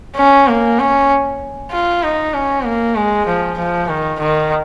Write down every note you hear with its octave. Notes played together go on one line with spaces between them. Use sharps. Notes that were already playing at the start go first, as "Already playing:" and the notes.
C#4
A#3
C#4
F4
D#4
C#4
A#3
G#3
F3
F3
D#3
D#3